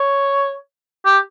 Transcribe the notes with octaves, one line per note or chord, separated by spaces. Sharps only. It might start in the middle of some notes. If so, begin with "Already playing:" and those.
Already playing: C#5
G4